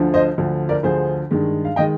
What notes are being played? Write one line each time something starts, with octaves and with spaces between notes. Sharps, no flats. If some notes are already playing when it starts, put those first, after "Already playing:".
Already playing: D2 D3 F3
C5 D#5
D2 D3 F3
A#4 D5
D2 D3 F3 G#4 C5
G2 D#3 G#3
F5
D#3 G#3 D#5 G5